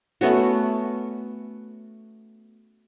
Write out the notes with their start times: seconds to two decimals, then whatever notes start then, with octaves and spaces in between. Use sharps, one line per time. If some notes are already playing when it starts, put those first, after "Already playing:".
0.21 A3 B3 C#4 F#4